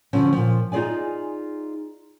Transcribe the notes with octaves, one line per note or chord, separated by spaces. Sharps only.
B2 D3 F3 C#4
A#2 F3
D#4 F4 G#4 D5 G#5